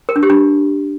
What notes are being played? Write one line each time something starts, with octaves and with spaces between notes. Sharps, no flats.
A#4
D4
G4
D4